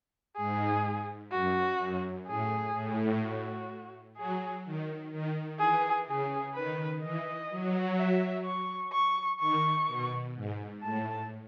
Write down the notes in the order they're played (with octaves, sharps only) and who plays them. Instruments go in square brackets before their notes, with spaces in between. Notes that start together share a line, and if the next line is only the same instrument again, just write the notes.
[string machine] G#2 [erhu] G#4
[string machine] F#2 [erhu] F#4
[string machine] F#2
[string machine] A2 [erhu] G#4
[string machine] A2
[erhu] F#4
[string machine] F#3 [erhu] G#4
[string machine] D#3
D#3
[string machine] E3 [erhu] G#4
[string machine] C#3 [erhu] G#4
[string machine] D#3 [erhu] B4
[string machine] E3 [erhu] D#5
[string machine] F#3
[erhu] E5
C#6
C#6
[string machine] D#3 [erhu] C#6
[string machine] B2
G#2
[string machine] A2 [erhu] A5